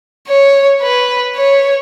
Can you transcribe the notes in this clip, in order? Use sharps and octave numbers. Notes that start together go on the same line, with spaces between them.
C#5
B4
C#5